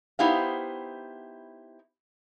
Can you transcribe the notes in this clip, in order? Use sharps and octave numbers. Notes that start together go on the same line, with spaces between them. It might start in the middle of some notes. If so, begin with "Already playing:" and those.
B3 D#4 E4 G4 C5 F5